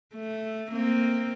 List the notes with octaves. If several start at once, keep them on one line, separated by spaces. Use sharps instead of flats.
A3
A#3 C4